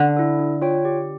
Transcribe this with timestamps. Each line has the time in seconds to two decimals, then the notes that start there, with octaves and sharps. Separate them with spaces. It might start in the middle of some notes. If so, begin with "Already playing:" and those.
Already playing: D3
0.17 E4 A4
0.39 D4
0.62 F4 C#5 G5
0.85 G4